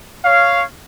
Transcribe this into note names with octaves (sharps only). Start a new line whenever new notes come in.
C#5 F5